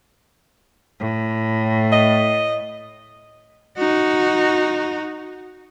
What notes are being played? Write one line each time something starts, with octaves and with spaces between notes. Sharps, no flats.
A2
D#5
D#4 F#4